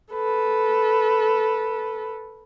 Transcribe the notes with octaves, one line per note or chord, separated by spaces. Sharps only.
A4 B4